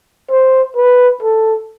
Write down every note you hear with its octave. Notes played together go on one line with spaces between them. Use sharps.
C5
B4
A4